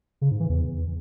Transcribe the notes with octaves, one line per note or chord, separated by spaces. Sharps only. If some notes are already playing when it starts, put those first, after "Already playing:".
C#3
G#2
E3
E2